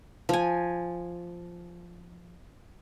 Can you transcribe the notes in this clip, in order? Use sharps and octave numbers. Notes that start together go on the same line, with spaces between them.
F3 G#5